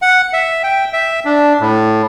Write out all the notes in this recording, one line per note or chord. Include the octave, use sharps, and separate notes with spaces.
F#5
E5
G5
E5
D4
A2